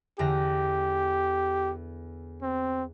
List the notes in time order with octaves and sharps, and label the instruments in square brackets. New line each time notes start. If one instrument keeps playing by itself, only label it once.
[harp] E2 D3 A#6 [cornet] G4
[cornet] C4